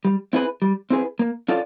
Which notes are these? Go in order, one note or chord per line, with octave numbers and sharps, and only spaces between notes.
G3
C4 E4 G#4 B4
G3
C4 E4 G#4 B4
A#3
C#4 F4 A4 D5